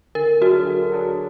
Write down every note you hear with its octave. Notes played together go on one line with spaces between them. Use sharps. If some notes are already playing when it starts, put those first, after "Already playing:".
D3 A#4
F#3 D4 F#4 G#4
D3
F#3 D4 G#4